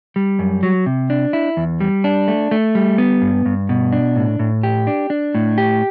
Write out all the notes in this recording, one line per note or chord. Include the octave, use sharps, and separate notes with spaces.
G3
F#2
F#3
C3
D4
E4
E2
G3
D4
A3
A3
G3
B3
G2
G2
B2
D4
A2
A2
G4
D4
D4
A2
G4